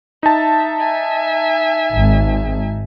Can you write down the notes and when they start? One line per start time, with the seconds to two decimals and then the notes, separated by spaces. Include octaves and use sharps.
0.23 D#4 E5 A5
0.79 E5 G#5
1.95 G#1